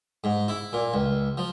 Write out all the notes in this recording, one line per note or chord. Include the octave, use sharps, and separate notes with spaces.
G#2
E4
A#2
C#2
F3